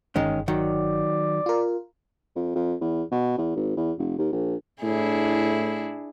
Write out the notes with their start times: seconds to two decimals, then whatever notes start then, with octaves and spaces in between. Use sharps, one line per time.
0.16 G1 D#3 G#3 C#4
0.48 D#3 F#3 D5
1.46 F4 A#4
2.36 F2
2.55 F2
2.81 E2
3.12 B2
3.38 E2
3.56 G#1
3.77 E2
3.99 F1
4.18 D#2
4.33 A#1
4.82 A2 D4 E4 G#4